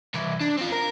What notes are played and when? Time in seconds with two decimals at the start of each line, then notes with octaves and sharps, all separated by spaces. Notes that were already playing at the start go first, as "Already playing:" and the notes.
0.14 C2 E3
0.40 D4
0.57 C4 F4
0.72 A#4